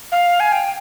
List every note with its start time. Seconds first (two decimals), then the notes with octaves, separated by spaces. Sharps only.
0.12 F5
0.40 G#5
0.52 G5